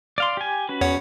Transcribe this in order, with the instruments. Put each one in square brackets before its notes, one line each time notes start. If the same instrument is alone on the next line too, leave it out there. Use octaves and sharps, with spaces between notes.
[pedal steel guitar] D5 F5 C6
G4 G#5
C#4 F#4 B4
[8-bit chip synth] E2 C#5 F#5